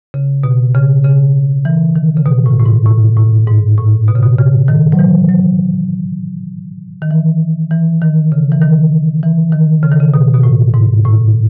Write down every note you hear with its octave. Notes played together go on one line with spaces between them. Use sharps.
C#3
B2
C#3
C#3
E3
D#3
C#3
B2
A2
A2
G#2
A2
A2
G#2
A2
B2
C#3
B2
C#3
D#3
F#3
E3
F#3
D#3
E3
E3
D#3
C#3
E3
D#3
E3
D#3
C#3
D#3
C#3
B2
B2
A2
G#2
A2